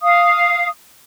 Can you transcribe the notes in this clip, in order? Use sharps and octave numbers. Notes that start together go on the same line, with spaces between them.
F5 D#6